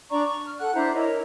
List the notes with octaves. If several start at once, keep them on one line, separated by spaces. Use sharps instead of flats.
D4 D5 A#5 C#6
C#6
F6
A4 F#5 F#6
D4 E4 C5 A#5
E4 A#4 C#5 D#5